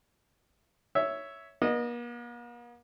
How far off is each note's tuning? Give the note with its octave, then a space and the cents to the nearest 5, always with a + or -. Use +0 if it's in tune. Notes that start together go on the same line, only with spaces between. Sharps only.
C#5 +5 E5 +0
A#3 +45 D#5 -20